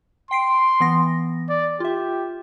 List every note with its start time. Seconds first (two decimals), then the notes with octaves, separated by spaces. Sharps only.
0.31 G5 C6 C7 D7
0.80 E3 B3 A#6
1.50 D5
1.80 F4 G4 E5